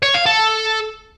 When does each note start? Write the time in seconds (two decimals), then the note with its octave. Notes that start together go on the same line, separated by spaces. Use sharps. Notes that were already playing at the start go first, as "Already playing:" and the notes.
0.02 C#5
0.14 F5
0.26 A4